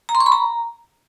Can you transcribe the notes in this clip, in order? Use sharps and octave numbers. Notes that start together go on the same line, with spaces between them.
A#5
C6
C#6
B5
A#5